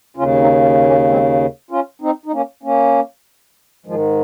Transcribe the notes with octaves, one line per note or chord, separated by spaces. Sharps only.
D#2 C#3 C#4 F4
C4 D#4
A#3 C#4
G#3 C4
C#4 F4
C4 D#4
D#4
A#3 C#4
A#3 C#4
G#2 D#3 F3 G#3